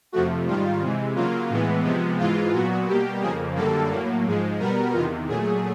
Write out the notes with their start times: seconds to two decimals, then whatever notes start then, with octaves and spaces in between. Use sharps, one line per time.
0.12 F2 C3 F3 A3 F#4
0.47 G#2 D#3 G3 F4
0.81 C3 E3 G#3
1.15 C#3 F#3 A#3 F4
1.50 A2 E3 G#3 B3
1.84 C3 F3 G#3 B3
2.19 G#2 E3 G#3 F4
2.53 A#2 F#3 B3 F#4
2.88 B2 G3 A#3 G4
3.21 F2 C#3 F3 A#3 G#4
3.56 F#2 D3 G3 A#3 A4
3.91 A2 F#3 A#3
4.25 G#2 F3 G#3
4.59 B2 G3 B3 A#4
4.93 E2 C3 D#3 F4
5.28 A#2 F#3 A3 G#4